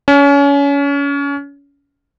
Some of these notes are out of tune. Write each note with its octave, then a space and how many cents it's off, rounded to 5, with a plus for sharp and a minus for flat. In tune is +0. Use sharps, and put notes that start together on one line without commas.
C#4 +30